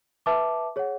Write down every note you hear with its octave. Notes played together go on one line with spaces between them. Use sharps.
B4 E5 A5 D6
G#4 C#5 F#5